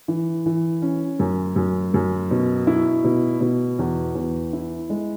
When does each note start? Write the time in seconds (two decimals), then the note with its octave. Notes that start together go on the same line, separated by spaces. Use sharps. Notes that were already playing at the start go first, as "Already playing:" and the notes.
0.08 E3
0.46 E3
0.82 C#4
1.19 F#2
1.56 F#2
1.94 F#2
2.31 B2
2.67 E4
3.04 B2
3.41 B2
3.79 E2
4.15 E2
4.53 E4
4.90 G#3